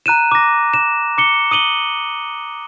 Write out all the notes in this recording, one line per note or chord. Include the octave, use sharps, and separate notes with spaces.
A#5 F#6 D#7 E7
D6 A#6
E7
D6 C#7 G7
D#6 D#7 F#7 G7